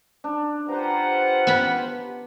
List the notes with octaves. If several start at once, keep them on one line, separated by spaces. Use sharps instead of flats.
D4
F4 G4 B4 C5 F#5 A#5
B3 B5